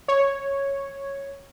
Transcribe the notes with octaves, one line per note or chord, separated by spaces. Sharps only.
C#5